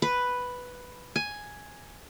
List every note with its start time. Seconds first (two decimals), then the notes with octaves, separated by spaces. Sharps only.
0.02 B4
1.16 G#5